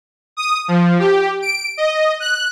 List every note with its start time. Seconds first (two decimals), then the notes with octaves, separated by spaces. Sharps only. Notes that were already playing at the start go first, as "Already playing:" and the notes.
0.37 D#6
0.68 F3
0.99 G4
1.42 D7
1.77 D#5
2.20 F#6